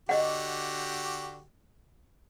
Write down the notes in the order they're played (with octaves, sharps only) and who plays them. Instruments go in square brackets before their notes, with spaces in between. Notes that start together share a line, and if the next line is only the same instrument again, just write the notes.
[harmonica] D3 F#4 G4 [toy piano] D#5 F#5